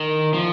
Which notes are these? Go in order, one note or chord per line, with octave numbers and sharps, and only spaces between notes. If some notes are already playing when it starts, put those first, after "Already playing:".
Already playing: D#3
F3